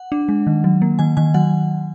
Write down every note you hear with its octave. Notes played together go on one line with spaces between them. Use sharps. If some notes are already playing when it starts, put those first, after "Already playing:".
Already playing: F#5
D4
G#3
D#3
F#3
A#3
D#3 G#5
D#3 G#5
F#3 F#5